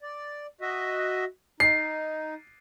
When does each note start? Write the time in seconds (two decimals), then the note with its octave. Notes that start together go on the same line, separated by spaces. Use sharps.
0.01 D5
0.61 F#4 D#5 E5
1.60 D#4 C7